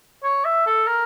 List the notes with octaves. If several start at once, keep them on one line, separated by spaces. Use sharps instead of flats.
C#5
E5
A4
A#4